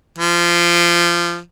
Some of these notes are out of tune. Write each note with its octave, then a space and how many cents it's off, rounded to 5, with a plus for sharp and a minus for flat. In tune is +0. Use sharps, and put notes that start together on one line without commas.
F3 -20